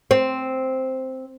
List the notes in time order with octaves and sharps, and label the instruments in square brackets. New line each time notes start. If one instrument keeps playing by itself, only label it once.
[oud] C4